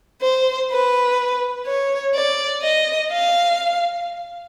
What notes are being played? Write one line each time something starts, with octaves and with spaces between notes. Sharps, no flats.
C5
B4
C#5
D5
D#5
F5